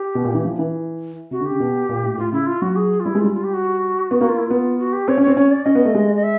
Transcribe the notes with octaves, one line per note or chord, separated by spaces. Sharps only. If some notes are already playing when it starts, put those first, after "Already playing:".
Already playing: G4
B2
A#2
E3
F3
E3
C3 F#4
D3
C#3 G4
B2
A#2
A2
A2 F4
C#3 E4
F4
F#3 F#4
G#4
F4
G3 E4
G#3
G3 F4
F4
G4
F#4
B3
A#3 F#4
F4
E4
B3 F4
F#4
G4
C4 C#5
C#4
C4 C#5
C#4 C#5
D5
C#4 D#5
B3
A3
G#3
D#5
E5